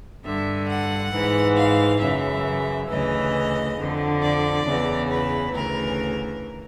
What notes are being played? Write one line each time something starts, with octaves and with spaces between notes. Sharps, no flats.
G2 D3 E5
F#5
G#2 E3
F5
F#2 C#3 E3 E5
D2 C#3 E3 D#5
F2 D3
D5
E2 C#3 E3
B4
D2 C#3 E3 A#4